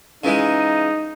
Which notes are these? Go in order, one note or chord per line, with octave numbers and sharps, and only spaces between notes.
C#3 E3 G#3 D#4